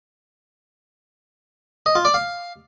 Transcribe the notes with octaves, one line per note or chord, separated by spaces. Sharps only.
D#5
F4
D5
F5